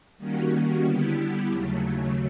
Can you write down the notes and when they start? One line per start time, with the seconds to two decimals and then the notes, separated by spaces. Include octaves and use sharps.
0.18 D#3 G3 A#3 C#4 F#4
0.83 D3 G3 B3 E4 G4
1.50 D#2 C#3 F#3 A3